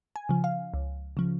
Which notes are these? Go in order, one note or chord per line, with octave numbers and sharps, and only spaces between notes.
G#5
C#3 F3
F5
C#2
C#3 F3